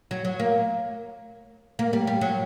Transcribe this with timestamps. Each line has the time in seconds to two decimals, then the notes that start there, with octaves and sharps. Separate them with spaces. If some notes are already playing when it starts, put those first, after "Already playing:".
0.11 F#3
0.25 F#3
0.39 A#3
1.79 A#3
1.93 G3
2.07 G3
2.21 F#3